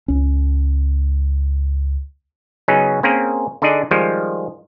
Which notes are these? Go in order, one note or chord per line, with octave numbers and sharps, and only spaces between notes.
C#2 C#4
C#3 F#3 B3 C#4 D#4 G#4
A#3 C4 C#4 G#4 A#4
D3 D4 D#4 G#4 D5 D#5
D#3 F3 G3 G#3